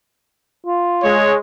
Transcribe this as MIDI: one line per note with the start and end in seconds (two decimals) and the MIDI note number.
0.67 1.14 65
1.02 1.36 56
1.02 1.36 73